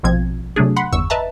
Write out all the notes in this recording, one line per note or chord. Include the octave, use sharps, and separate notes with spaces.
A#1 B2 F3 C4 G#6
C3 F#3 A3 D4 G#4
F#5 B5 C6
G1 E2 C#6 E6
B4 D#5 E5 A5 A#5